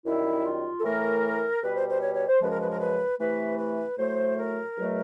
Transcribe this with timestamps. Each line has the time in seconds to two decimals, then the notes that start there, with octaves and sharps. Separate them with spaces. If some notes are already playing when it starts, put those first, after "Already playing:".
0.05 F#2 D#3 G3 E4
0.44 F4
0.79 A4
0.84 A2 E3 A3 A#4
1.62 B2 G3 B4
1.75 C5
1.89 C5
2.02 C#5
2.15 C#5
2.28 C5
2.41 F#2 C#3 F3 G#3 B4
2.51 A#4
2.61 B4
2.70 A#4
2.80 B4
3.19 C3 E3 A3 B4
3.59 B4
3.98 A2 F#3 A3 C5
4.37 A#4
4.77 E2 B2 F#3 A3